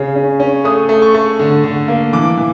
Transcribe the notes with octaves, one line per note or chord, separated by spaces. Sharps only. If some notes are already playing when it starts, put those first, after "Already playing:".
Already playing: C#3 C#4
C#4
C#4
A3 D#6
A3
C#6
A3
D3
D3
A#3
E3 D6
E3